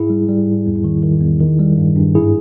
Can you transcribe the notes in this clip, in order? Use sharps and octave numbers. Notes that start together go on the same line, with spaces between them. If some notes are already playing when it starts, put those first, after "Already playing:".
Already playing: G#2 E4 G#4
G3
G3
G#2
E2
D#3
D#3
E2
D#3
G3
G2
G2
G#2 E4 G#4